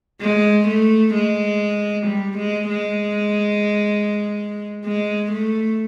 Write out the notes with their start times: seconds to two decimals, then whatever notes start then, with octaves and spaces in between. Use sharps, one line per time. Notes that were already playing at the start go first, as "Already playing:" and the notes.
0.21 G#3
0.68 A3
1.14 G#3
2.07 G3
2.38 G#3
2.69 G#3
4.85 G#3
5.32 A3